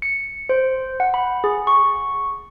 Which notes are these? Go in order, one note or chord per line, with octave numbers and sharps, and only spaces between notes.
C#7
C5
F#5
B5
G#4
C#6